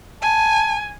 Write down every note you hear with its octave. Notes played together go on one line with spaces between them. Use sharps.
G#5 A5